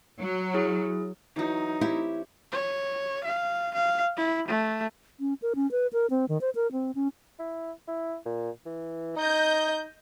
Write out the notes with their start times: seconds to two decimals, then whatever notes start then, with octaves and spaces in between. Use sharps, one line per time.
0.19 F#3
0.54 E4 G#4
1.36 E3 F#3 D#4
1.81 C4 E4 G4 C#5
2.52 C#5
3.24 F5
3.74 F5
4.17 E4
4.48 A3
5.20 C#4
5.42 A#4
5.55 C#4
5.71 B4
5.93 A#4
6.10 C4
6.29 D#3
6.41 C5
6.55 A#4
6.72 C4
6.95 C#4
7.39 E4
7.88 E4
8.25 A#2
8.66 E3
9.16 D#4 D#5 G6